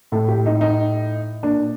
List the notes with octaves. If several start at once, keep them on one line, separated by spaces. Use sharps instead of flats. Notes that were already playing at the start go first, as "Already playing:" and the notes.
A2 A4
G4
D#4
D#4
A#2 D4